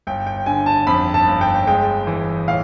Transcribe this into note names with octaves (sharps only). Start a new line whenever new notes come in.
G1 G5
G5
D3 G#5
A5
F2 B5
A5
G1
G5
G#3 G5
E3
A2 F5